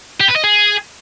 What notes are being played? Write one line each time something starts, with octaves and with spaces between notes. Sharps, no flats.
G4
B4
D#5
G#4